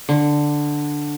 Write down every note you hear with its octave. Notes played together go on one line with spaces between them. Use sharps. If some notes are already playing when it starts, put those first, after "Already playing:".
D3